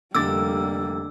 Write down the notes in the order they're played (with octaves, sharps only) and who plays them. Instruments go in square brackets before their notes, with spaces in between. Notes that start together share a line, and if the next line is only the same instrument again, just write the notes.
[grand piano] F1 D6 A6 [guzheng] D3 D4 [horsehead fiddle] G3 A#3 [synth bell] E6